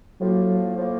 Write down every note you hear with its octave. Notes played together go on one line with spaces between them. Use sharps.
A2 F3 F#3 A#3
A2 F3 A#3